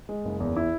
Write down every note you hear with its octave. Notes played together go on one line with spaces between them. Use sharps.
G#3
F#1
E2
E4